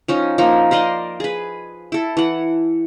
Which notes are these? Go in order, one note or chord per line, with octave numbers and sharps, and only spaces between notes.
F3 C#4 D#4
F3 A#3 D#4
A#4 C5 D5 D#5
G#4 B4
E4 A4
E3 F#5